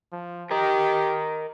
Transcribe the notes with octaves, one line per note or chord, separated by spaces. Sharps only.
F3
G4 A#4 D#5